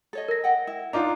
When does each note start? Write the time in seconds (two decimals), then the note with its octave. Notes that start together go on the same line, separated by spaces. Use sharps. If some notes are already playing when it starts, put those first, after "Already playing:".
0.13 A4 C#5 D#5
0.28 A#4 A#6
0.44 D#5 F#5 G5
0.67 E4
0.93 D4 D#4 F4 A#5